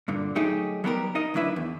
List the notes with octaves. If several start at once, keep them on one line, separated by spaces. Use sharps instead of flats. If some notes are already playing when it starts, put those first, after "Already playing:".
G2 A#2 D3
F#3 A3 D#4 G4 G#4 D#5
F#3 G3 B3 G4 A4 A#4
D#4 A#4 D#5
D2 F#3 D4 E4 B4 E5
E2